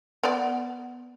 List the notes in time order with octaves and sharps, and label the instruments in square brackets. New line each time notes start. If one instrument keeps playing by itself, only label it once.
[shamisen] B3 D5